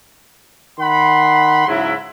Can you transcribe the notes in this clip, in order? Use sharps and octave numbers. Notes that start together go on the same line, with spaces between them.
D#3 F#5 B5 C6
G#2 C#3 F#3 E4